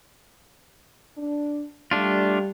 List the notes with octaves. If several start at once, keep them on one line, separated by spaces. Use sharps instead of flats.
D4
G3 A3 D4 F4